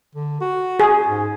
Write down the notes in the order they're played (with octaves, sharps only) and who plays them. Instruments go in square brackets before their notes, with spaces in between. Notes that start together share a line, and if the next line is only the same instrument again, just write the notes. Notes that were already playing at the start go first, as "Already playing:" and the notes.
[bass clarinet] D3
F#4
[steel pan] G#4
[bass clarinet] G#2